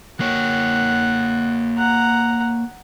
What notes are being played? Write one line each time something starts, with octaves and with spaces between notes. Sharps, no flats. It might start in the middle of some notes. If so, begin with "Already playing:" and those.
A#3 C#5 F#5
F#5 A#5